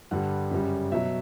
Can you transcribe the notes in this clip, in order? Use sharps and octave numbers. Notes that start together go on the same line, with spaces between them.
G2 D3 G3 F#5
F#2 C#3 G3
B2 F#3 E5